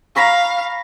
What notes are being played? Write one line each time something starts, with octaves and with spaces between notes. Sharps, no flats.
F5 A#5 B5 C#6